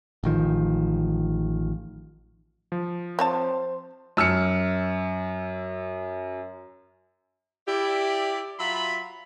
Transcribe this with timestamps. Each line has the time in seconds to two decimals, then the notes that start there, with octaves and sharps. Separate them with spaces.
0.24 A1 D#3 F3
2.72 F3
3.19 C4 C5 C#5 A5
4.17 F#2 E6 F6 C#7
7.67 E4 G4 D5
8.59 F#3 F4 E5 B5